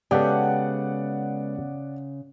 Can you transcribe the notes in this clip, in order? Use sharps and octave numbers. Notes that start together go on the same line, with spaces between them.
C#3 G#3 B3 G4 A4 D5 F#5